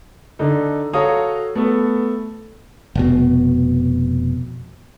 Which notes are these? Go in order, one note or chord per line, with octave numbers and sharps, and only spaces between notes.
D3 D#4 A4
F#4 A4 C#5 F5 A#5 D#6
A3 B3 A4
F1 B2